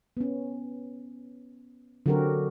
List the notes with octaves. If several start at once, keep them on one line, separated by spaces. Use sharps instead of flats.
B3 C#4
D3 F#3 C4 F#4 G4 A#4